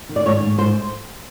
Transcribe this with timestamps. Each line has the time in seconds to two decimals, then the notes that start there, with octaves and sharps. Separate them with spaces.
0.09 D#3
0.16 D5
0.26 G#2 C#5
0.43 G#2
0.58 G#2 C5